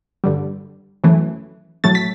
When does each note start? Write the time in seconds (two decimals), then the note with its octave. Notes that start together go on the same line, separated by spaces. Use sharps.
0.24 G2 D3 G3
1.04 F#2 E3 A3
1.84 A2 F#3 A3 A6
1.95 B6